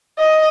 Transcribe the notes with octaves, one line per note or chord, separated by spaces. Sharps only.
D#5